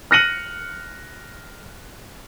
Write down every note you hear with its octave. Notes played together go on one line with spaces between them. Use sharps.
F6 F#6 A#6 C#7 D#7 F#7